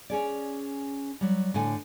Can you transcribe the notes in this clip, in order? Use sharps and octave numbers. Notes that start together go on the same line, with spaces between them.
C#4 G#4 D5
F#3 G3
A2 D3 G#5